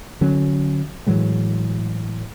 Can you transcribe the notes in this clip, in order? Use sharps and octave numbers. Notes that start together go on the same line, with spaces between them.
D3 F#3 C#4
A2 E3 F#3 G#3